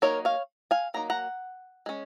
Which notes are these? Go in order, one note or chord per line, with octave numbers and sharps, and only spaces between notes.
F#3 A#3 D#4 A#4 C#5
C#5 F5
F5 G#5
F#3 A#3 D#4 A#5
F#5 A#5
G#3 C#4